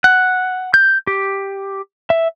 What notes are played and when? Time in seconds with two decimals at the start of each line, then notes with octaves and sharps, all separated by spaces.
0.04 F#5
0.74 G6
1.07 G4
2.10 E5